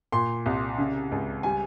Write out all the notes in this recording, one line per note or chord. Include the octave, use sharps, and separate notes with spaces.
A#2 C6
C2
C#3
C#2
G3 G#5